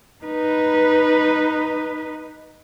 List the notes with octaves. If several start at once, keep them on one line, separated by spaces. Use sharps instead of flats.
D#4 B4